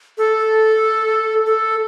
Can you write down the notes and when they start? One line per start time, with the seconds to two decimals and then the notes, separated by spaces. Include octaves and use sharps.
0.18 A4
1.46 A4